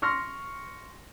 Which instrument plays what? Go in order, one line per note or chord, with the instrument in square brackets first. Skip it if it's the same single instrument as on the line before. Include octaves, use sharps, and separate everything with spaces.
[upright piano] C6 C#6 F6 A#6